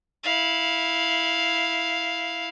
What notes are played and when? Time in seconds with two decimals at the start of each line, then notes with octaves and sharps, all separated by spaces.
0.23 E4 F5